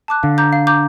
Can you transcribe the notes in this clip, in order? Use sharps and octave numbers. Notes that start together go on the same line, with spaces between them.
A5 D6 F#6
D3 F5
A#5 D6 G6
F5
A#5 D6 G6